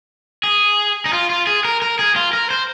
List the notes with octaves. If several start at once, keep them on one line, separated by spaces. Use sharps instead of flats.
G#4
D#4
F4
F4
G#4
A#4
A#4
G#4
F4
A#4
C5